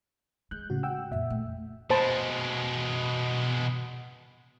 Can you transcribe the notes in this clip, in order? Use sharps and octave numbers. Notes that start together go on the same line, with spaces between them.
G#3 F#6 G6
A2 C#3 F#4
F#5 G5 E6
F2 A#2 D3 E5
A3
B2 G#3 C5 A5 B5